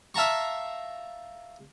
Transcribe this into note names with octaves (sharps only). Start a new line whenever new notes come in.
E5 F5 A5 A#5 C#6